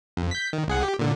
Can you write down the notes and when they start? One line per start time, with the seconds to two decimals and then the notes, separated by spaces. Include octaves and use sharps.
0.17 F2
0.31 G6 B6
0.53 D#3
0.68 C2 G#4 F#5
0.83 G4
0.99 A#2 D3